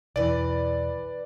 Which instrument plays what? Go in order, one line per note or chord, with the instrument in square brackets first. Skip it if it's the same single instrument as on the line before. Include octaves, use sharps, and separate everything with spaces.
[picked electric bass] B1 E2 [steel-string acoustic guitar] E3 B4 [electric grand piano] D5